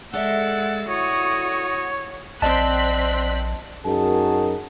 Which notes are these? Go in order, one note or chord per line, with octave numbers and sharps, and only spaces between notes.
G#3 A4 D5 E5 F#5 E6 A6
E4 F#4 C#5 D#6
A#1 C4 D5 D#5 A5 F#6 B6
F#2 D#4 F#4 G#4 A#4 A5